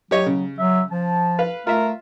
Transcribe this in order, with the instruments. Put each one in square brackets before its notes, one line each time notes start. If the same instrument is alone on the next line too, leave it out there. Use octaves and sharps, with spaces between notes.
[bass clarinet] F#3 [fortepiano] G4 C#5 D#5
[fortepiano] C#3
[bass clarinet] F#3 [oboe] E5
[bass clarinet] F3 [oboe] A5
[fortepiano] B4 F5
[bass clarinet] A3 [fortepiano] F4 E5 [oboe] A#4